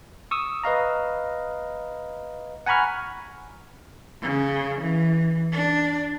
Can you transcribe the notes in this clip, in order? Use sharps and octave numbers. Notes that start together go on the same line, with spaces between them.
C#6 D#6 E6
B4 D#5 F5 A#5
F#5 G#5 A#5 B5 C#6 F6
C#3
E3
D4